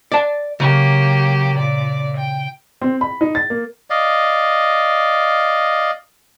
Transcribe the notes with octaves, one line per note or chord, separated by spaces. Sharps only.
D5 A5
C#3 F#3 A#3 G4
A#2 D5
G5
C4
B5
D#4
A6
A#3
D5 D#5 F5